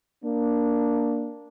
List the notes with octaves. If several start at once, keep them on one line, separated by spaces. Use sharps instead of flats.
A#3 D4